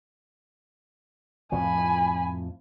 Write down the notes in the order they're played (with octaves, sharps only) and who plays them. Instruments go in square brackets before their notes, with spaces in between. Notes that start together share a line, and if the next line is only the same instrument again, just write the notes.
[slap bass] F2 A2 F3 [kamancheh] G#5 B5